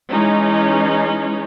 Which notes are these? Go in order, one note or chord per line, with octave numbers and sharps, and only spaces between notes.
E3 G#3 C#4 D#4